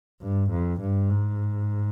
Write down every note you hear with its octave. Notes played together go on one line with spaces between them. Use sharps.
G2
F2
G2
G#2